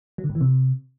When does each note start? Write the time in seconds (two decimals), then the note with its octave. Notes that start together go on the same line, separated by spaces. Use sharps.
0.18 F#3
0.24 D3
0.29 G2
0.35 E3
0.41 C3